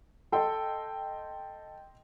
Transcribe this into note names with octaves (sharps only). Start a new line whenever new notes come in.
A4 D#5 G5 C6